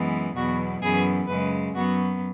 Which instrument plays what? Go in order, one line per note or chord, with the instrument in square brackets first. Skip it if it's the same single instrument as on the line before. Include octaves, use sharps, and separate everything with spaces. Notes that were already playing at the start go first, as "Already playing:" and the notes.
Already playing: [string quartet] F#2 E3 G#3 B3
E2 B2 F#3 B3 F#4
F#2 E3 B3 G#4
F#2 C#3 G#3 B4
F#2 F#3 B3 F#4